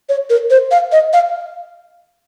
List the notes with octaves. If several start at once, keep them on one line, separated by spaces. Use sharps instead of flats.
C#5
A#4
C5
F5
D#5
F5